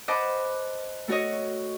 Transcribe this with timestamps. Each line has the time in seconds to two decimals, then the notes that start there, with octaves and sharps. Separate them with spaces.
0.08 B4 C5 D#5 F#5 A5 D6
1.08 A3 F#4 C#5 D#5